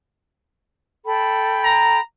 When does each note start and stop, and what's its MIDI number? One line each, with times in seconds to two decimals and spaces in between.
1.05 1.99 69
1.05 1.99 79
1.05 1.99 83
1.64 1.98 82